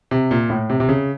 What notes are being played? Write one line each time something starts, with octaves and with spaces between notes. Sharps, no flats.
C3
A#2
A2
C3
C3
C#3